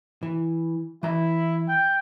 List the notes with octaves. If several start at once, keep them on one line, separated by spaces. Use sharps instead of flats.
E3
E3 E4 A#5
G5